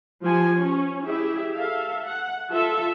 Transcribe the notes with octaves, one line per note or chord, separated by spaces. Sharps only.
F3 G4 G#5
C#4
E4 G4 G#4 E5
A4 E5 F5
F#5
F4 A4 E5